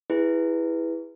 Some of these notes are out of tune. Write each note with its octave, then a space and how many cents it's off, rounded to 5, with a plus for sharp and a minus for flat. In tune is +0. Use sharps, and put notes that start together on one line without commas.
E4 +0 G#4 -30 B4 +0